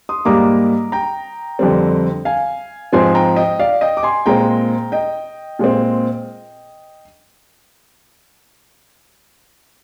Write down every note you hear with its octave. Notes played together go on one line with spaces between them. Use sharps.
C6 D#6
G#2 G3 A#3 A#5 D6
G5 A#5
F2 D3 G3 C4
F5 G#5
G#2 F3 C4 G#5 C6
G5 A#5
D#5 G5
D5 F5
D#5 G5
D6
G#5 C6
A#2 G#3 C4 G5 A#5
D#5 G5
A#2 G#3 C4